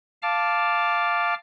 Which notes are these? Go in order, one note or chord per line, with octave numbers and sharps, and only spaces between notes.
F5 A5 D6 F6